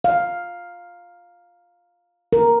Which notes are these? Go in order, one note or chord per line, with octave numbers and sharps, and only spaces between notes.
F5
A#4